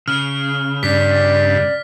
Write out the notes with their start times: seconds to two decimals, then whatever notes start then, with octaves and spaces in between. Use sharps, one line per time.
0.08 C#3 F6
0.83 G2 D5 B6